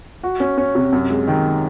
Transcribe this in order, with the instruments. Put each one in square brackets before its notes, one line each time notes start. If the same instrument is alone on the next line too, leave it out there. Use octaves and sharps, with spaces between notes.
[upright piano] F#4
C#4
C#4
C3
F#2
G#3
D#3